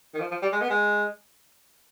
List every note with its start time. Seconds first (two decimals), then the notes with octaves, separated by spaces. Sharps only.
0.14 D#3
0.20 F3
0.31 F3
0.42 G3
0.52 G#3
0.61 B3
0.70 G#3